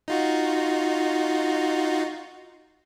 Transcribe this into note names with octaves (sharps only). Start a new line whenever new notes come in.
D#4 F4 F#4